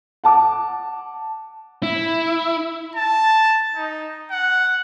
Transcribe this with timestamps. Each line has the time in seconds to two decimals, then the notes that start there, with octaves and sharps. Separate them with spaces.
0.24 F#5 A5 D6
1.83 E4
2.96 A5
3.76 D#4
4.31 F#5